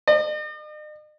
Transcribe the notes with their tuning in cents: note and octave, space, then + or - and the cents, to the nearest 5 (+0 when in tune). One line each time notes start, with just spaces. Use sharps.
D#5 -45